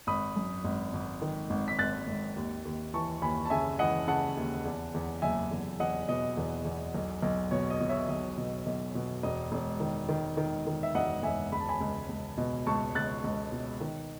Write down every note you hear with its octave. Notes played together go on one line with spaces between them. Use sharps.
G#1 B5 D#6
F#2
G#1
G#1
D#3
G#1
B6
G#1 F#6 A6
G#1
D#2
D#2
E3 A5 C#6
D#2 G#5 B5
A5
C#3 E5 G#5
E3 D#5 F#5
C#3 F#5 A5
D#2
E2
E2
F#1 E5 G#5
E2
E2 D#5 F#5
B2 D#5
E2
E2
B1
B1
B2 C#5
D#5
B2
C#5 E5
B1 D#5
B2
B1
B2
E1 D#5
E1
D#3
D#3
D#3
D#3
E5
E1 D#5 F#5
E1 E5 G#5
C#2 B5
A5
G#5 B5
C#2
C#2
B2
C#2 A5 C#6
C#2 F#6 A6
C#2
B2
D#3